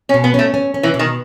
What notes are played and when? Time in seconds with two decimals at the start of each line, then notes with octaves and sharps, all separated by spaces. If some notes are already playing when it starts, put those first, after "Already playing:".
0.09 C#4
0.14 B2
0.24 B3
0.34 A3 C#4
0.54 C#4
0.74 C#4
0.83 E3
0.94 B2
0.99 D#3